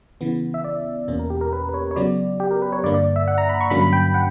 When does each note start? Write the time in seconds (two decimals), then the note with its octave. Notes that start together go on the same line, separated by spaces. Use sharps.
0.21 C#3 E3 B3
0.54 E5
0.64 D5
1.08 E2 B2 A#3 C#4
1.19 A#4
1.30 G4
1.41 A#4
1.53 B4
1.69 B4
1.74 C#5
1.91 C#5
1.96 C#3 F#3 B3 D5
2.40 G4
2.51 A#4
2.62 B4
2.72 C#5
2.84 G2 D3 A#3 D5
2.94 D5
3.16 E5
3.28 F#5
3.38 A#5
3.49 B5
3.61 C#6
3.70 G2 D3 F#3 A#3 C#4 B5
3.82 B5
3.93 G5
4.14 F#5